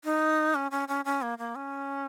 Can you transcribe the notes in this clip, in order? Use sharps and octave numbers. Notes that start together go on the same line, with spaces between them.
D#4
C#4
C#4
C#4
C#4
A#3
A#3
C#4